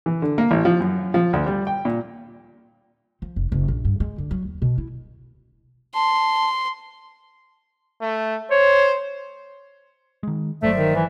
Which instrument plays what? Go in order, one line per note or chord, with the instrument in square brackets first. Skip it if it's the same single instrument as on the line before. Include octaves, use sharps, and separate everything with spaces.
[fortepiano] E3
D3
A#3
A1
F3
F#2
F3
D2
G3
G5
A#2
[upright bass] F3
F1
F#1
A#1
G2
G#3
D3
F#3
D#2
B2
E4
[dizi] A5 [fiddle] C6
[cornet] A3
[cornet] C5 [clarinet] C#5
[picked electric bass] D#3 G#3
[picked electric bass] G1 F#3 [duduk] A3 [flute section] C5 D5 E5
[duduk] D#3
E3